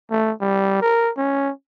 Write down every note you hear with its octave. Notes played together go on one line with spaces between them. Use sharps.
A3
G3
A#4
C#4